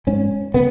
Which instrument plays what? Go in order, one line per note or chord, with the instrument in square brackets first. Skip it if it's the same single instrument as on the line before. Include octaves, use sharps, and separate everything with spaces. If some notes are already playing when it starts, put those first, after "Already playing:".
[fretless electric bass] G#2 C#4
C#3 B3